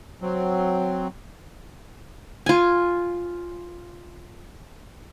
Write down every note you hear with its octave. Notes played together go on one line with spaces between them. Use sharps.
F#3 C4
F4 G#5